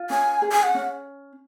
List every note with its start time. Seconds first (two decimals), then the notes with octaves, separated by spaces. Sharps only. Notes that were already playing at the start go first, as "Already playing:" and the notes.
Already playing: F4
0.10 C#4 G#5
0.42 G#4
0.52 G#5
0.63 F#5
0.75 C#4